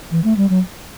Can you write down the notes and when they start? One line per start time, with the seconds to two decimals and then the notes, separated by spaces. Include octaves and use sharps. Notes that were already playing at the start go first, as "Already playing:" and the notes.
0.11 E3
0.24 A3
0.37 G3
0.50 F#3